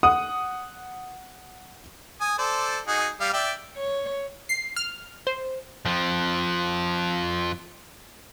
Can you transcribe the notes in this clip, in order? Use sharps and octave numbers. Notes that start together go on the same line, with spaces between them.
F#5 D#6
G#5 D#6
A4 C5 D5
D#4 F#4 G#4
G3 F5
D5 E5 G5
C#5
C7
F6
C5
F2 F3